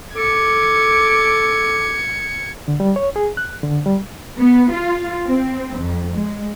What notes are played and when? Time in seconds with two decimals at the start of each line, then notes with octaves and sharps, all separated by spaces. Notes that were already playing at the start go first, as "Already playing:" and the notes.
0.16 A4 D6 G#6 C#7
2.68 D3
2.80 G3
2.96 C#5
3.16 G#4
3.37 F#6
3.63 D3
3.86 G3
4.38 B3
4.73 F4
5.26 C4
5.79 F2
6.15 G#3